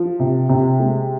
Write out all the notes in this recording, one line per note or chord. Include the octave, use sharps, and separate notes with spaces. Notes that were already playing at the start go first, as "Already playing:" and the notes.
Already playing: F3
C3
C3
G#3